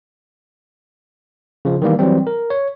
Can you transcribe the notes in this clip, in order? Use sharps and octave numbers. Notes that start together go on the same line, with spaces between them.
C#3 F3
D#3 E3 G3 A#3
E3 F#3 G3 C4
A#4
C#5